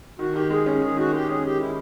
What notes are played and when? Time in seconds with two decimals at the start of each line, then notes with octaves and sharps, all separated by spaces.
0.19 D#3 F#4
0.35 D#3 G4
0.50 G#3 G#4
0.66 C#4
0.82 D#3 G#4
0.97 D#3 F#4
1.13 G#3 G4
1.29 C#4 G#4
1.44 D#3 G4
1.59 D#3 E4